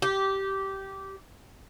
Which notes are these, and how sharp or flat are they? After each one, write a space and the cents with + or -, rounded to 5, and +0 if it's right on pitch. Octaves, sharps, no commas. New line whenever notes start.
G4 -15